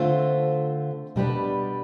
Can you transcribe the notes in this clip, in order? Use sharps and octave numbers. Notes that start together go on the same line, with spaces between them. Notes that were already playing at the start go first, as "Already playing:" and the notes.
Already playing: D3 A3 C4 F4 C5
B2 G3 D4 G4 B4